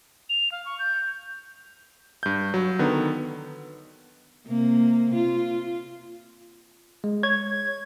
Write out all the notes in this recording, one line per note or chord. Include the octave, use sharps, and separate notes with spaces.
F7
F5
C#6
G6
G2 G6
F#3
D3 D#3 B3
C3 A#3
F4
G#3
C#5 G#6